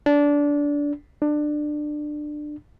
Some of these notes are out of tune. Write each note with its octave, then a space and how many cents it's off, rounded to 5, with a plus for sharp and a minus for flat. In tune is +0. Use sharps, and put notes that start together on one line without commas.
D4 -20
D4 +20